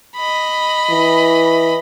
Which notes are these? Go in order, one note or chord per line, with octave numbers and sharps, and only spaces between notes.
D#5 B5
E3